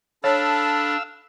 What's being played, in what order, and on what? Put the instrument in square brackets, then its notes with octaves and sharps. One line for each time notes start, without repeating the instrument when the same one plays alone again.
[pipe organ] D4 [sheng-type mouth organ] A4 A5 B5 [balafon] C#5 [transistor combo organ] F5 E6